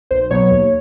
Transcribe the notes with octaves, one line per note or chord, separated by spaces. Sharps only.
B1 C5
B2 F#3 B3 C#5
D#2